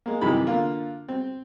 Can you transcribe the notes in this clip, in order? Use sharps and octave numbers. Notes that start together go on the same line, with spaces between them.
G#3 A#3
B1 C3 D#3 E3 B5
D3 A#3 F4
C4